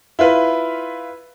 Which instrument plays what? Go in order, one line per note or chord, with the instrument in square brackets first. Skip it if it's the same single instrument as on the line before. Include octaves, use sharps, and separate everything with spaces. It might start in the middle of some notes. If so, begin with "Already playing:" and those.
[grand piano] E4 F4 B4